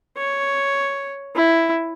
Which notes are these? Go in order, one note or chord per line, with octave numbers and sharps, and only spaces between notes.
C#5
E4